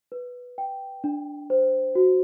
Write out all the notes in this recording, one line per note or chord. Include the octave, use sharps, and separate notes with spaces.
B4
G5
D4
C5
F#4